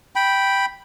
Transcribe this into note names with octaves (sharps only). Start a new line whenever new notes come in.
G5 B5